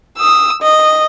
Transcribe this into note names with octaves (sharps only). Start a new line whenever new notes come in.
D#6 E6
D#5